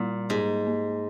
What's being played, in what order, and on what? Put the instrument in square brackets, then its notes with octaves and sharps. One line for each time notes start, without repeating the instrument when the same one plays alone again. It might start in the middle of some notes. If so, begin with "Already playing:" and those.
Already playing: [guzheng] A#2 [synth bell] G3 A#3
[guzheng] G#2 [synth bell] A#3
[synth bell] A#3